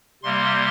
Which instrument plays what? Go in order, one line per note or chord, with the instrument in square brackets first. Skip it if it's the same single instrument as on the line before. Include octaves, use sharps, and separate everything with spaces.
[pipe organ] C3 G3 A#3 C6